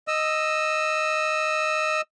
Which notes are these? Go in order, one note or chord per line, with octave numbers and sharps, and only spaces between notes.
D#5 E6